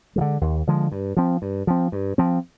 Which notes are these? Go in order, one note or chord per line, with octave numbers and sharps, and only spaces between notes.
F3 G#3
D3
D#2
D3 F3 G#3
G2
F3 C4
G2
F3 C4
G2
F3 C4